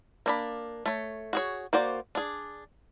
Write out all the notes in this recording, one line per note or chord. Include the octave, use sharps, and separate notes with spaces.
A#3 D4 B5
A3 C#5
F#4 G#4 C#5
A#3 F#4 C5 D5
D4 G#4